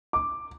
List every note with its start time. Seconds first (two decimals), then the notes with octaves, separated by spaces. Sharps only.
0.13 D6